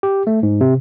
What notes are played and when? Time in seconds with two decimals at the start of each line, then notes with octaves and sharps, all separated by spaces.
0.03 G4
0.27 A3
0.43 G#2
0.61 C3